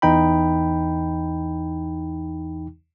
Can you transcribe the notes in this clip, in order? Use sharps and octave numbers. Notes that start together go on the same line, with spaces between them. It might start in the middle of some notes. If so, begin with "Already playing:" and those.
E2 E3 D#4 G5 B5